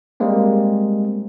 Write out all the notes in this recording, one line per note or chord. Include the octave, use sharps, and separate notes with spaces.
G3 G#3 A#3 C4